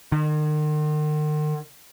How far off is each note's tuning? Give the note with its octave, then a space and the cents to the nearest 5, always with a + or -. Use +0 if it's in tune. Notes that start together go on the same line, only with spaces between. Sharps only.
D#3 -40